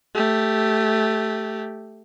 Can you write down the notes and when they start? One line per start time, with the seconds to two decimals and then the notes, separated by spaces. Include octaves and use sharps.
0.15 A3 G4